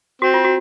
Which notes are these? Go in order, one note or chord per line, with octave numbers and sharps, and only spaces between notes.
C4 F#4
F4
F#4